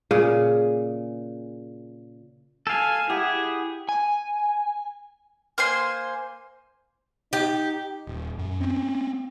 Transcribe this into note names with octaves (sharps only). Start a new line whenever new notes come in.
A#2 C#3 G#4
A4 F5 G#5
E4 G4 G#4 F#5
G#5
A#3 C5 G#5 C6
D#4 G4
D#1
F#2
C4 C#4